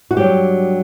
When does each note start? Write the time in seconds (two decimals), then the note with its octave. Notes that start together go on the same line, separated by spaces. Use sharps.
0.11 F#4
0.16 G2 F#3 G4